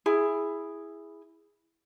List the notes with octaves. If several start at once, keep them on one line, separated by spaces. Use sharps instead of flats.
E4 G#4